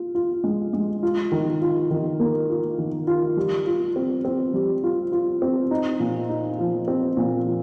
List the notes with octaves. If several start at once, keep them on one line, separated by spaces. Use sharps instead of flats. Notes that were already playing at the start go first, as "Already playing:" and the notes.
Already playing: F4
F4
G#3
G#3
F4
D#3
F4
D#3
A#3
F4
D#3
F4
G3
F4
C4
C4
G3
F4
F4
C4
D#4
A#2
D#4
F3
C4
A#2
F3